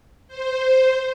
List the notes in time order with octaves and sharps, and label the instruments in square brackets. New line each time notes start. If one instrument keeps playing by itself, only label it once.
[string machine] C5